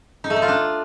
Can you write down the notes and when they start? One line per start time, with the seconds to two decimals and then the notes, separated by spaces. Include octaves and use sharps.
0.24 D#4
0.30 A3
0.36 D#4
0.42 F4
0.48 D4